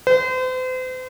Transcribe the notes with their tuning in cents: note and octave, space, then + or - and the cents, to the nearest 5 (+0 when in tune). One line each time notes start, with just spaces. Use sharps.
C5 -40